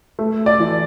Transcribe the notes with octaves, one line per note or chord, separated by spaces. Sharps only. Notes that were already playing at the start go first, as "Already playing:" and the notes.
A3
D5
E3